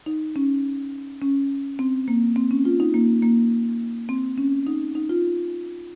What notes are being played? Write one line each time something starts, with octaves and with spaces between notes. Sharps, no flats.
D#4
C#4
C#4
C4
A#3
C4
C#4
F4
D#4
A#3
A#3
C4
C#4
D#4
D#4
F4